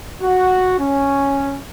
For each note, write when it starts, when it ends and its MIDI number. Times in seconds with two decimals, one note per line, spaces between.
0.22 0.77 66
0.78 1.60 61